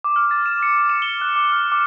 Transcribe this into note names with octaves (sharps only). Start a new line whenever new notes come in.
D6
F6
A6
E7
C#7
E7
G7
F#6
D6
F6
D6